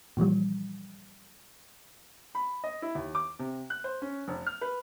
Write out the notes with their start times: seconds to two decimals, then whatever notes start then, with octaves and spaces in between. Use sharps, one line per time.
0.17 A#2 E3 F3 G3
2.35 B5
2.64 D#5
2.82 E4
2.95 D#2
3.15 D6
3.39 C3
3.70 F#6
3.84 C5
4.02 C#4
4.28 F1
4.46 F6
4.61 B4